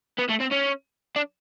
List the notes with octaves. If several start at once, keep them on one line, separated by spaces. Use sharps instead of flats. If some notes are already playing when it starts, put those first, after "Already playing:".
B3
A3
C4
C#4
D4